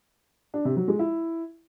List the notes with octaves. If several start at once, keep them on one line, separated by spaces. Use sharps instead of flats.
D4
C3
F#3
G#3
E4